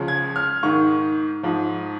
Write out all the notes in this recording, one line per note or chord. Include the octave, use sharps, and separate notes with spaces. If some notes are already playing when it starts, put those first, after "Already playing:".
Already playing: C#2 C#3 F3
G#6
F6
G#2 D#3 C#6
G#2 F3